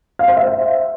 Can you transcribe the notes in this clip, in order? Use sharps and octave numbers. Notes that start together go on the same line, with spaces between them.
F5
C5
E5